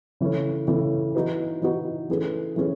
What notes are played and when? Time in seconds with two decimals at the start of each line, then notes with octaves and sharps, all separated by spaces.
0.21 C#3 E3 A3 C#4
0.68 C#3 E3 A3 C#4
1.15 E3 B3 D#4 F#4 B4
1.62 E3 B3 D#4 F#4 B4
2.09 E3 A3 C#4 G#4 B4
2.56 E3 A3 C#4 G#4 B4